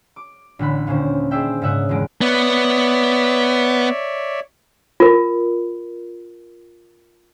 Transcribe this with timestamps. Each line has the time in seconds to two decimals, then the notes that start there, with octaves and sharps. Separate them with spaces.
0.16 D6
0.59 A1 D3 F#5 B5
0.87 D#2 A#2 D3 C#4 C5
1.31 G#4 C5 D5 E5 G5
1.62 G#2 C#3 E5 F#5 D#6
1.89 D#1 E2 G#3 D7
2.21 B3 C#5 D5 E5
5.00 F4 A#4